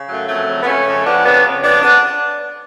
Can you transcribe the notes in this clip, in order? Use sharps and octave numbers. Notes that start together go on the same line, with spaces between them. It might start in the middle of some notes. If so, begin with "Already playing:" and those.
Already playing: C#3
F#2 F#3 A3
F2 F#3 A3
C#3
B3
C#3 A3 C#4
F2
F2 B3 D4
C#3 B3 D4
C#3
F2 B3 D4
B3 D4